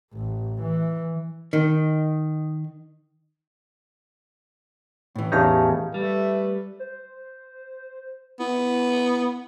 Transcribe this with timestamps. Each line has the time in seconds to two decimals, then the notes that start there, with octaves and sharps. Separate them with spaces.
0.13 A1
0.62 E3
1.53 D#3
5.16 A2 E3
5.32 E2 C#4 D#4 G4 F5 A5
5.94 G3 A3 B4
6.79 C5
8.40 B3 E4